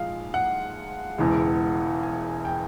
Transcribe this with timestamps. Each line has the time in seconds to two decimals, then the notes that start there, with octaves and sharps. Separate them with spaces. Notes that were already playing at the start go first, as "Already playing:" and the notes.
Already playing: A#1 G#2 F3 G#3 F5
0.34 F#5
1.18 E1 E2 C#3 E3 G#3
2.03 G#5
2.45 G5